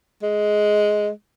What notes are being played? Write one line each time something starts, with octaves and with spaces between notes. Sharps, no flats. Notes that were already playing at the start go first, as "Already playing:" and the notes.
G#3